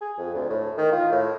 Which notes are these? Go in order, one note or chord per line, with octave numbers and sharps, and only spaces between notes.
G#4
F2
D2
A2
D#3
F4
A2